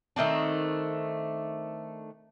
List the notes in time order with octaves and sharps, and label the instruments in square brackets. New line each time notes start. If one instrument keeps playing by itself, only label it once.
[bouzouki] D#3 A3 C4 D4